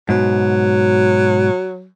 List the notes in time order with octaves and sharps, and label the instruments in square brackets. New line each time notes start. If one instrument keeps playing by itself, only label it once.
[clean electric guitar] G#2 B2 [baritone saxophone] F#3